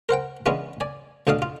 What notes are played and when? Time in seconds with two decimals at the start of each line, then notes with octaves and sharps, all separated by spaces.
0.09 A#4 C5 F#5 G5
0.46 E3 G#3 B3 C#4 D4 F4
0.80 D5 G#5
1.27 D2 B2 D3 D4 F5 D#6
1.42 F4